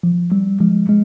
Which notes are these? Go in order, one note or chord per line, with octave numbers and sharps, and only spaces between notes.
F3
G3
F3 G#3
G#3